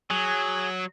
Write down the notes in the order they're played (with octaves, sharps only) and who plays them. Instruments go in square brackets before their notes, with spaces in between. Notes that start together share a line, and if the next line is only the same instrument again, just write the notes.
[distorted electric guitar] F#3 [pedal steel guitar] G#4